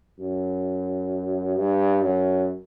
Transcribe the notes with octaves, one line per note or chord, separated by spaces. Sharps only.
F#2
G2
F#2